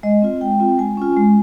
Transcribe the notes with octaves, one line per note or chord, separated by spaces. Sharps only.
G#3 D#5
C4 F4
G#3 G5
C4 F4
G#3 G#5
C#4 F4
G#3